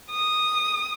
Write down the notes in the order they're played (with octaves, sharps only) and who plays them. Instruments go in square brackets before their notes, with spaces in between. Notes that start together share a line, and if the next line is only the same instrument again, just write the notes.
[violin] D#6